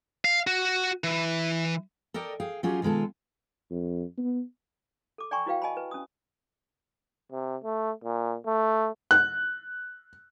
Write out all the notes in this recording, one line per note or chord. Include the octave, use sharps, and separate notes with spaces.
F5
F#4
E3
A4 A#4 D5 D#5 G5
G#4 F5 G5
F#3 C#4 F4 G4 G#4
B2 D#3 G#3 F4 A4
F2
B3
A4 D6
D5 G5 G#5 A#5 C6 C#6
E4 F#4 B4 F5 G5
D#5 G#5 A5 B5
B4
C#4 D#6
C3
A3
A#2
A3
F#6